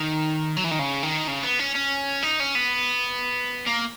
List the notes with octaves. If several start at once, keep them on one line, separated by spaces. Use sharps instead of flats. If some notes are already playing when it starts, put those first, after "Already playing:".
Already playing: D#3
F#3
E3
D#3
C#3
D#3
C#3
B3
C#4
C#4
D#4
C#4
B3
A#3